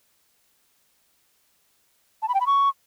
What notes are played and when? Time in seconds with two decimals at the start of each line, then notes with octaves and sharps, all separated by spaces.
2.22 A5
2.28 B5
2.34 G5
2.40 B5
2.47 C#6